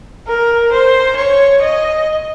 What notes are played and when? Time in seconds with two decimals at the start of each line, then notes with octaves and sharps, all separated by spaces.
0.27 A#4
0.72 C5
1.16 C#5
1.62 D#5